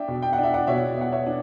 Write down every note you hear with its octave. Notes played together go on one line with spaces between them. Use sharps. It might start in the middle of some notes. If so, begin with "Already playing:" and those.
Already playing: D4 E5 G5
B2
G5
F#5
D4
E5
D5 F#5
B2 C#5 E5
B3 F#5
C#5 E5
D4